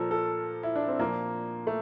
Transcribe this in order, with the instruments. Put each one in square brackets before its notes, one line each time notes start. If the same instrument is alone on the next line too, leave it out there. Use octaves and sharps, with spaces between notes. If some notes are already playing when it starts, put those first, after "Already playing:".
Already playing: [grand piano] A#2 F3 A4 A#4
A4
E4
D4
C4
A#2 F3 A#3
A3